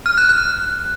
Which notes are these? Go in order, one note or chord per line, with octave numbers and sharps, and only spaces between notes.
F6
F#6
F#6